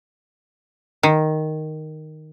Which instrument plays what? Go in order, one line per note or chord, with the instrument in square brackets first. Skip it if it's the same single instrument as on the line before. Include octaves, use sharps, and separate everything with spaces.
[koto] D#3